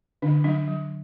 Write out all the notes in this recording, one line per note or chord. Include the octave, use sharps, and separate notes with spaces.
D3 D4
F#3 D4
F#3